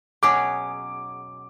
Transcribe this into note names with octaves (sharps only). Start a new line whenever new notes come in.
B2 F#3 C#4 G#4 D6